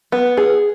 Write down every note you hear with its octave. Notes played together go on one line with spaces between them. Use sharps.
B3
G#4